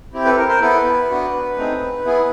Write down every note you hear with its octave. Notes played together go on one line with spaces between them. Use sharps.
C4 E4 G4
A4 B4
A#4
A#4 C5
B3 E4 A4 B4
B3 D4 F#4
A3 C4 D#4 G#4
B3 E4 G#4